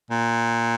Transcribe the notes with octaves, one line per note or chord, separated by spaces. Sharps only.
A#2